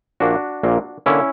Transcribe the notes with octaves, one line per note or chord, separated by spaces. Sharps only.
A#1 A#2 A#3 D4 F#4
A#1 A#2 A#3
D3 A#3 C#4 E4